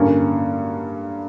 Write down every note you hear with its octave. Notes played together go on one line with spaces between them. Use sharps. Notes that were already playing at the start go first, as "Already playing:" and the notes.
Already playing: G2 D3 A#3 C#4